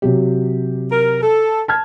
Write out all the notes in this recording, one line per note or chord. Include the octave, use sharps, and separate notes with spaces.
C3 F#3 G4
A#4
A4
A5 F6 G#6